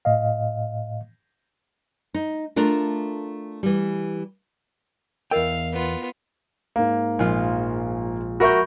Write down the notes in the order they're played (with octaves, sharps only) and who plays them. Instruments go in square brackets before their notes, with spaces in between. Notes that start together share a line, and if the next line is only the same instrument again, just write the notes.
[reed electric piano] A2 D#5 F5
[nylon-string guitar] D#4
A3 D4 F4 A#4
E3 G3
[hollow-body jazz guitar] E2 G5 [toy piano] E4 A#4 D#5 [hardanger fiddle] F5
[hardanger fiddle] B3 F4
[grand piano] G#2 A#3
[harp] A#1 G#3 F4
[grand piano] F#4 A#4 E5 [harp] B5 C#6 G6